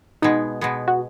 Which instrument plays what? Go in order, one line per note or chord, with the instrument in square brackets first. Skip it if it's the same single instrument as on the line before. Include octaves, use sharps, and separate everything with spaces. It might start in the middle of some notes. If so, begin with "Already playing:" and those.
[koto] B2 G#3 B3 [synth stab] D#4
[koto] B2 G#3 B3
[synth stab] F#4